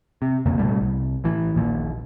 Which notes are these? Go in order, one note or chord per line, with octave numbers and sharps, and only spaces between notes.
C3
E1 F2 C#3 A#3
A1 B2 G3 A3
C2
A1 A2 E3
D#1 A#1 D#2 A#2